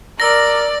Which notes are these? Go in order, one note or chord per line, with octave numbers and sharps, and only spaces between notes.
A#4 D5 E6 A#6